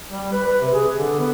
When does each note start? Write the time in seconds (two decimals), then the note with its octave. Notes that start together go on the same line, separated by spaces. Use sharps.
0.08 G3
0.33 B4
0.47 B4
0.61 C3
0.74 G#4
0.98 D3
1.19 B3